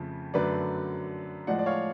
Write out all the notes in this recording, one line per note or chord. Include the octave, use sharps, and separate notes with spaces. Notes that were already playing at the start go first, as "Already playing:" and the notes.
Already playing: F2 C#3 F3 A3
F#2 D3 F#3 A3 B4 D5
A2 F3 G#3 D5 F#5
D5
C#5 F5